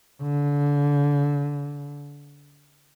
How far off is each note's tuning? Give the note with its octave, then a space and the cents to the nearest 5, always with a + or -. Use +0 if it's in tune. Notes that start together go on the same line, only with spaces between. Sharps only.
D3 -30